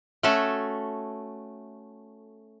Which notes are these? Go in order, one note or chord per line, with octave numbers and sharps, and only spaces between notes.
A3 C#4 F#4 A4 E5